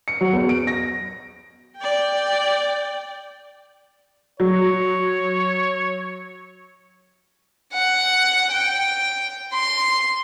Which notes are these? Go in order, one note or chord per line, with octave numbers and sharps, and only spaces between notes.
C#7
F#3
E2
D7
A#6
D5 G5
F#3 C#5
F#5
G5
C6